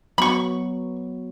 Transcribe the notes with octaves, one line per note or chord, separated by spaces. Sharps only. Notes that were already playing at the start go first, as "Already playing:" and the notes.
F#3 B3 F#4 B5 C#6